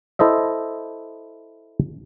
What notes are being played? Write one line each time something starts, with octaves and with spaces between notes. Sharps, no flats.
E4 A4 C5 D#5 E5